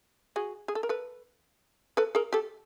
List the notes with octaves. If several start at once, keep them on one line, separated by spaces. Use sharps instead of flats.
F#4 G#4
G#4
A4
A#4
A4 B4
A4 B4
G#4 A#4
G4 A4